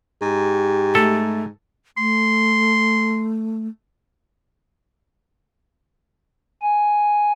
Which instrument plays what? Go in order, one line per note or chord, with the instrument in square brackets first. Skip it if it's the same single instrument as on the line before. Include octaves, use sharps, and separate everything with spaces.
[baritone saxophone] G#2 [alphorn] G4
[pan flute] A3 [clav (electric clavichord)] A4
[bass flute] A3 [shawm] C6
[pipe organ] G#5